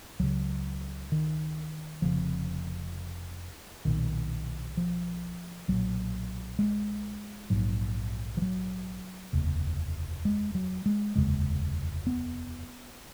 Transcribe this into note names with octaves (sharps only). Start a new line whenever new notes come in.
C#2 C#3 F#3
D#3
F1 F2 C#3 F3
B1 A#2 D#3
F3
B1 A#2 F#3
G#3
A#1 G#2 F#3
F3
F#3
F1 D#2 C#3
G#3
F#3
G#3
F1 D#2 C#3 G#3
B3